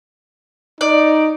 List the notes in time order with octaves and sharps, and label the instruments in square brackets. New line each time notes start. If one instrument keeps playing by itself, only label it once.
[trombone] D#4 [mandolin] D5